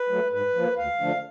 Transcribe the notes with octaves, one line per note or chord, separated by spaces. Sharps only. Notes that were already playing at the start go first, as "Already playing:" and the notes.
Already playing: B4
F#3 A3
G#2 B4
F3 A#3
D2 F5
D3 F3 A3 D4